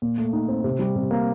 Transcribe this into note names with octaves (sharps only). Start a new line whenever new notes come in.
A#2
A3
D#4
C4
C3
G3
C3
A#3